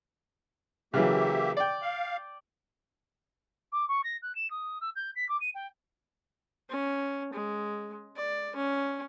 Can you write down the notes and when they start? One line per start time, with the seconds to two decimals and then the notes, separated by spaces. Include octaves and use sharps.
0.94 C#3 E3 F#3 A#3 G4 E5
1.57 D5 G5
1.82 F5
3.72 D6
3.88 C#6
4.03 A#6
4.22 F#6
4.35 E7
4.50 D#6
4.81 E6
4.95 G6
5.15 B6
5.28 D6
5.40 D#7
5.54 G5
6.70 C#4
7.33 G#3
8.16 D5
8.56 C#4